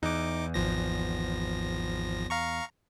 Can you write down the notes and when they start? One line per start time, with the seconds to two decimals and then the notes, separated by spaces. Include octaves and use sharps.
0.03 E2 D#4 D6
0.54 G#1 F3 A#6
2.30 F5 A#5 C#6